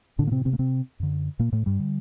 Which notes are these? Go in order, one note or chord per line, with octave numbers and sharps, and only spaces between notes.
A2 D3 D4
A#3
C3 C4
C3 C4
A#3
C3 C4
F#2 D3
A#2 A#3
A2 A3
G2 G3
D3